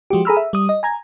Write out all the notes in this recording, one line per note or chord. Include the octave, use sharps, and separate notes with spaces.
F3 G#3 F#4 G4
G#4 A4 A#5 B5 E6 F6
E5
G3 D#6
D#5
G#5 A#5 G#6